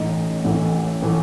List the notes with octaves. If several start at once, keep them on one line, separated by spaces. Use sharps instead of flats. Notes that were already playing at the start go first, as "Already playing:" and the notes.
Already playing: A1 A2 E3 A3 D#4 D#5
A1 A2 E3 A3
A2 E3 A3